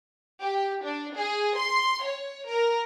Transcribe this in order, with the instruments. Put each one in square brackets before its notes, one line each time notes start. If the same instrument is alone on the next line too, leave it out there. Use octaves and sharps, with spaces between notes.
[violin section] G4
D4
G#4
C6
C#5
A#4